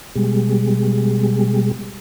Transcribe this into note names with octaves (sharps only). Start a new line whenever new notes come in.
B2 G3 G#3